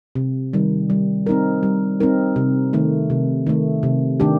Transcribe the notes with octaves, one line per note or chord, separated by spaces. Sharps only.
C3
D#3 G3
G3
C4 D#4 A#4
G3
C4 D#4 A#4
C3
D#3 A3
C3
D#3 A3
C3
D#3 A3 D4 G4